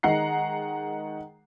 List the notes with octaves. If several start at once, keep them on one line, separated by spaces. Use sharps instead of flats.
D#3 G#3 F#5 A#5 C7